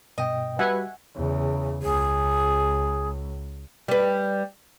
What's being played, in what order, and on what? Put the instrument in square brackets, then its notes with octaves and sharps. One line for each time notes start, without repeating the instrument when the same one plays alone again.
[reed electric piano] G2 B2 G5 [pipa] D#5
[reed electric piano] G3 F#4 G4 [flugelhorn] B4 [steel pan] E5 F#5 G#5
[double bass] E2 C#3
[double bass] C#2 [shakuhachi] G#4
[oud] G3 B4